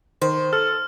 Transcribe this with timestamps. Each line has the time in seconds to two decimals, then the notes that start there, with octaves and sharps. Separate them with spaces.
0.22 D#3 C5
0.53 A4 F6